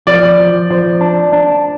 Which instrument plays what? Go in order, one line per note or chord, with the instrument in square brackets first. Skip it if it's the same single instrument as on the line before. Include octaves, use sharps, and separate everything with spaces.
[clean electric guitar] F3 [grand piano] D5
[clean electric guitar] F3
[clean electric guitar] F3 [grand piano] C5
[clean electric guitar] D4
D4